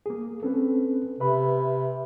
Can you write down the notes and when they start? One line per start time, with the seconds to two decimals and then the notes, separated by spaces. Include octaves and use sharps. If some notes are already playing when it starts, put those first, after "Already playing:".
0.06 A#3 G#4
0.43 C4 C#4 A4 B4
1.20 C3 B4 E5 B5